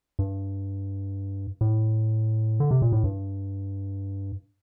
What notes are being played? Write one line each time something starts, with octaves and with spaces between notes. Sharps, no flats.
G2
A2
D3
C3
A#2
A2
G2